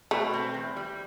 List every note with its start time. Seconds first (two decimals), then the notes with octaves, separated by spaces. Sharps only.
0.11 B2 A3
0.33 C4
0.54 E2
0.76 G3